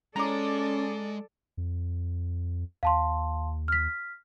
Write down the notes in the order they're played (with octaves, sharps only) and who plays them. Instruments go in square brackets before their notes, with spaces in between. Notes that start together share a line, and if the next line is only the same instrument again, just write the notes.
[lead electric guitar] G#3 [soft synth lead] C#4 [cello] A4 D5 [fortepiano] A#5 D6
[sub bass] F2
[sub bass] D#2 [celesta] F5 A5 C6
[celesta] F6 B6